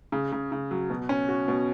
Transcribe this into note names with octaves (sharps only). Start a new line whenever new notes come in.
C#3
C#3
C#3
F#3
B2
C#4
F#4
B2